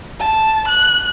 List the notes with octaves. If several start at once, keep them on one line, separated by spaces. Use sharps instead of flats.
A5
F#6